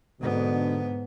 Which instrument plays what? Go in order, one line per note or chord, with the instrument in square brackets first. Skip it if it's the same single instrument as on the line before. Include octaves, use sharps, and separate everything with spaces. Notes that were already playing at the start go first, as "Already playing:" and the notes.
[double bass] G#2 B3 [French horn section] B2 D3